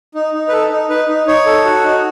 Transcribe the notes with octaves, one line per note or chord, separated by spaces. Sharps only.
D#4
D#4
B4
A4
D#4
D#4 B4
D#4
D#4 C#5
A4
F#4
D#4